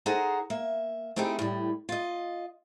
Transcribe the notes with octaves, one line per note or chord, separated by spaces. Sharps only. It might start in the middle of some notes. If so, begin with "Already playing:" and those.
D#4 G#4 A4 C5 F#5 A#5
A#3 E5
A3 C4 D#4 E4 G4 G#4
A2 G3
F4 D#5